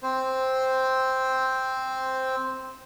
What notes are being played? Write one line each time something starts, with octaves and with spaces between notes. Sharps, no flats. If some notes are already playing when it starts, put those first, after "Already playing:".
C4 C5